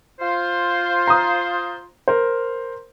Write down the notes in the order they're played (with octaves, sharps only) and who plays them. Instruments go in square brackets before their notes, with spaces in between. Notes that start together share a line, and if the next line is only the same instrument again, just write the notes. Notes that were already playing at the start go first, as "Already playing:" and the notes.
[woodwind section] F4 C5
[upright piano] A#5 D#6
A#4 C5